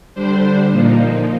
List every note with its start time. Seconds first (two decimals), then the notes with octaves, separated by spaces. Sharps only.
0.14 D3 G3 D4 C5
0.71 A#2 F3 A#3 D#4